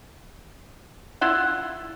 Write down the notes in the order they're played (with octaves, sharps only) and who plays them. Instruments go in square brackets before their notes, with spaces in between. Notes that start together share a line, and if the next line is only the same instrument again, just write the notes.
[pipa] E4 F4 F#5